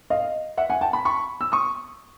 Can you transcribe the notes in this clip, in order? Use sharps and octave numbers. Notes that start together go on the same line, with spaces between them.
D#5 F5
E5 F#5
F#5 G#5
G5 A5
A5 B5
B5 C#6
E6
C#6 D#6